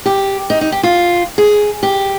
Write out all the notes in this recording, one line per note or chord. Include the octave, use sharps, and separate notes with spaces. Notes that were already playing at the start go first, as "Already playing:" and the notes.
G4
D#4
D#4
G4
F4
G#4
G4